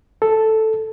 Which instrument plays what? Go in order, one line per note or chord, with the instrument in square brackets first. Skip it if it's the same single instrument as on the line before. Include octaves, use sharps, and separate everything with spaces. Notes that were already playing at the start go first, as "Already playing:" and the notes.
[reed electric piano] A4